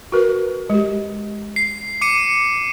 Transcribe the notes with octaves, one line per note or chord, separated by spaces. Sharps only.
F#4 A#4 B4
G#3 G4
C7
D6 C#7 D#7